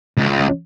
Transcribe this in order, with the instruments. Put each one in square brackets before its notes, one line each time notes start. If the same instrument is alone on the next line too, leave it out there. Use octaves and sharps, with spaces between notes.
[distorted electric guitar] C#2